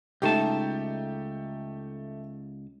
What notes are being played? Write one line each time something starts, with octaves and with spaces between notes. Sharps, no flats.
C#2 A3 D#4 G4 A5